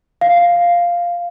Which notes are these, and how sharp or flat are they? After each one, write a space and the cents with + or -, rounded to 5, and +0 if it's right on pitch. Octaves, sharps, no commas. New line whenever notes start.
F5 +0